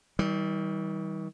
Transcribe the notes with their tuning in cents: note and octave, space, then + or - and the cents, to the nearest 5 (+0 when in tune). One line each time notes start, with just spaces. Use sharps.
D#3 +45 G3 -10